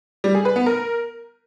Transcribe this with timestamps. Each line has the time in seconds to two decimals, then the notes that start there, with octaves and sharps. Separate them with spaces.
0.24 G3
0.35 G#4
0.45 B4
0.56 B3
0.66 A#4